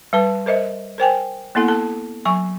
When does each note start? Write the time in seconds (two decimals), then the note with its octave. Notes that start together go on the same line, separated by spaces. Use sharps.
0.13 G3 B4 A5
0.46 A#4 C5 D#5 E5
0.98 A#4 C5 G5 G#5
1.55 A#3 B3 E4 A4 F#5
1.68 A4 A5
2.25 F#3 G#5 C#6